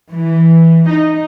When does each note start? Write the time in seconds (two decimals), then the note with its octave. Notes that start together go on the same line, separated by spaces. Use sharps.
0.13 E3
0.90 D#4